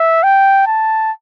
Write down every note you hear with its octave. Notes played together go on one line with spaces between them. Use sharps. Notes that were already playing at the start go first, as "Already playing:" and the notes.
Already playing: E5
G5
A5